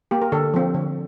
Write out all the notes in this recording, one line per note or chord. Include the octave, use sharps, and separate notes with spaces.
A#3 G4
A#4
D3 A4
F3 C4
D3